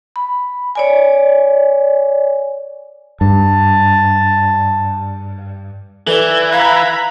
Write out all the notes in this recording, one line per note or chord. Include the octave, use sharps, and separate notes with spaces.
B5
C#5 D5 G#5
G2 A5
E3 A4 B4 D5
F5 A#5 B5 F#6 G#6 A#6